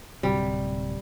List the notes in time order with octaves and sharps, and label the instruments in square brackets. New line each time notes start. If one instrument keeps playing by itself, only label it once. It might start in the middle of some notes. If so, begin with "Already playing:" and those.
[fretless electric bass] D1 C3 [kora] G3